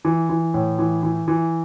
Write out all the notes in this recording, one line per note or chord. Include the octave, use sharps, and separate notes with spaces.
E3
E3
A2
E3
E3
E3